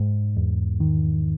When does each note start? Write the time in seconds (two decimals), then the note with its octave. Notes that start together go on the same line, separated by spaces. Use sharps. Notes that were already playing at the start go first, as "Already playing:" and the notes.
Already playing: G#2
0.37 E2
0.80 D#3